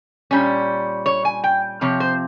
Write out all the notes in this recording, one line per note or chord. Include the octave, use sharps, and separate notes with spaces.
A#2 G3 C#4
C#5
G#5
G5
C3 F3 C4 F4 C#5
C5